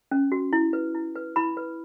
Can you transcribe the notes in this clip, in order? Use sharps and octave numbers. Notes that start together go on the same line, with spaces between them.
C#4
F#4
E4
B4
E4
B4
E4 B5
B4